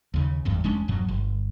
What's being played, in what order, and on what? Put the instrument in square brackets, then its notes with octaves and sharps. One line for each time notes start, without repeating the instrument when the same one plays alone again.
[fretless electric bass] D#2 C#3
G#1 E2 G2
E1 G#3 C#4 D4
E1 G2 B2 F#3
G1